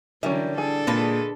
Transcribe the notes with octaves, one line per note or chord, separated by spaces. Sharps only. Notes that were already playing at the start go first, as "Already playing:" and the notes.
D3 E3 F#3 G3 C#4 A#4 E5
D4 G#4 A4
A#2 G#3 B4 A5